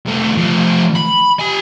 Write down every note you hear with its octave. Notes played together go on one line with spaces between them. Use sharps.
C2 A3
F3 A3
B5
G4 G#5